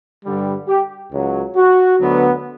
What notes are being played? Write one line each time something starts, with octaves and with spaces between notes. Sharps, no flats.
G2 D3 G3
G4
C#2 C#3 F#3
F#4
D2 D3 F#3 B3